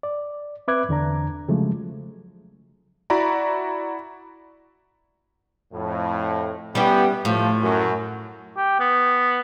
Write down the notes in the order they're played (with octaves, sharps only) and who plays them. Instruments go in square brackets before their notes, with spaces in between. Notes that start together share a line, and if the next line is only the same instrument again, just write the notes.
[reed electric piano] D5
C4 B4 E5 D6 F#6 G#6
E2 D3 D4 A#5
C#3 F3 F#3 G#3 A3
[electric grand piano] E4 F#4 D5 A#5 B5
[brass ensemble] F2 A2
[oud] G3 C#4 E4 [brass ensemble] B3 G4
[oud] A2 [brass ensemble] F3
[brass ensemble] F#2
[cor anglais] G4
B3